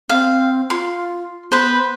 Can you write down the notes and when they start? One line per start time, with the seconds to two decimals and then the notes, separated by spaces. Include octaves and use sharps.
0.09 C4 F5
0.70 F4 C6
1.52 B3 B4 C5